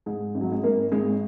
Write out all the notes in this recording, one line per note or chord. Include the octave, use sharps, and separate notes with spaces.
G#2 G#3
G#1
F#3
G#3
G#1 A#3
G#1 G#3